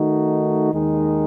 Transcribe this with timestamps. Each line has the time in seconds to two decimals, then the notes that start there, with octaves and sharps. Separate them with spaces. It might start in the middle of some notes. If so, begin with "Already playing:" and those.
Already playing: D#3 A3 D#4 F#4
0.73 D#2 D#3 G#3 D#4